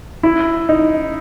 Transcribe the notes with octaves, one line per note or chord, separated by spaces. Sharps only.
E4
D#4